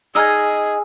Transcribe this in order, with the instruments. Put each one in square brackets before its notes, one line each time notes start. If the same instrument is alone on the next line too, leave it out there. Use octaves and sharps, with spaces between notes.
[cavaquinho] D#4 D#5 A#5 [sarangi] G#4 [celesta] E6 F6 G#6